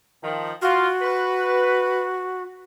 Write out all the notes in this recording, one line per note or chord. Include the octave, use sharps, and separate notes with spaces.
D#3 F3
F4 F#4
B4